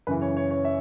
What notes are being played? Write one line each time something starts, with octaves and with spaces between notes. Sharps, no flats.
F#2 C#3 E3 B4
C#5
C#5
C#5
E5